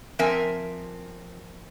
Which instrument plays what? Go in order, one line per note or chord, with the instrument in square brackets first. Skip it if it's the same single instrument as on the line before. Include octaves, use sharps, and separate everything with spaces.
[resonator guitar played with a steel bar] F3 C4 A#4 E5 G#5